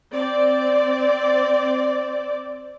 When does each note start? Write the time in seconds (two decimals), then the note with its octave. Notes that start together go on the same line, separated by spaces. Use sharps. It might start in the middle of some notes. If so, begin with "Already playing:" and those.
0.13 C4 D5